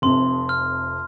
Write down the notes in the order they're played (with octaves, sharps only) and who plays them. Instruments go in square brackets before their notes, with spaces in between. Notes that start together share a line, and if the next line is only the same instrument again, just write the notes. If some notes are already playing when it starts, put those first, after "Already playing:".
[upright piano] F1 F2 C3 [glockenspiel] C6
[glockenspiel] F6